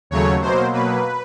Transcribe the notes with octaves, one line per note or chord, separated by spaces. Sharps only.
D#2 C#3 F#3 A3 C#5
B2 F#3 A#3 C5
B2 F#3 A#3 B4